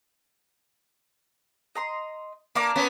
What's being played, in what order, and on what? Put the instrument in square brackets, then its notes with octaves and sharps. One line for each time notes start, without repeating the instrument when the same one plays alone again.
[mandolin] D#5 A#5 C6
[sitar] A#3 [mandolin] D4 A#5 D6
[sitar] A#3 B3 C#4